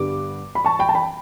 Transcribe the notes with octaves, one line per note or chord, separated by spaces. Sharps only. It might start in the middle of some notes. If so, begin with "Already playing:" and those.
Already playing: G2 D3 G3 B3 D6
B5
A5 C#6
G5 B5
A5
G5 B5